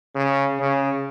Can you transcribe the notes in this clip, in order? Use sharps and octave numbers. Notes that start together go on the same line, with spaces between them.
C#3
C#3